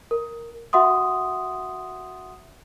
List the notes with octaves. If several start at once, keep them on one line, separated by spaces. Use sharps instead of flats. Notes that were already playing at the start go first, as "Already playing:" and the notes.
A#4
F#4 E5 F#5 C6 D#6